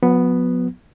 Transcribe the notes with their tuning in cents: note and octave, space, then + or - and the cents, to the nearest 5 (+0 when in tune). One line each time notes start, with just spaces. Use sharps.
F#3 -45 B3 +0